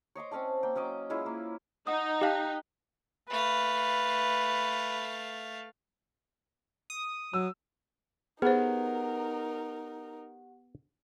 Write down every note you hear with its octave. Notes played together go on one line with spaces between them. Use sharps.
C#5 D#5 C6 D6
C4 C#4 D5 A5
A#3 G5
F#3 C#4 D#5 D6
G#3 C#4 E4 F4
A#3
D#4 F#5 D#6
G4 F5 G5 A5 F#6 B6
A3 B4 F5
D#6
F#3 E6
B3 D#4 G4 G#4 A#4 C5 F#5